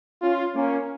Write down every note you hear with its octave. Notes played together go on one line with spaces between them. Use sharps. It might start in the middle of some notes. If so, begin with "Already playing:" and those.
C#4 F4
A#3 C#4